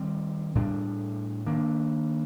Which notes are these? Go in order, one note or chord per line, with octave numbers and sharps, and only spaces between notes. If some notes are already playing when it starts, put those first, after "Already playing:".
Already playing: D#3 G3 C4
A2 G3 D4
D#3 A#3 D4